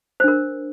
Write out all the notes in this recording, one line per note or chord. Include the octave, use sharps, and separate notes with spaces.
D4 A#4 C5